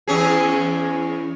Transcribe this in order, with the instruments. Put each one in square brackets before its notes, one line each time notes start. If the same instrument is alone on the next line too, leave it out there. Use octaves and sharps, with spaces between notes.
[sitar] E2 C#4 G#4